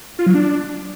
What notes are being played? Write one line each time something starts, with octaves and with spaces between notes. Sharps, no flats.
F4
F#3
D4